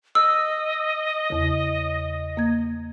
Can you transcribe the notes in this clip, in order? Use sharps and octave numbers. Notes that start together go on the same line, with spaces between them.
D#5 E6
E2 C#3
A#3 G#6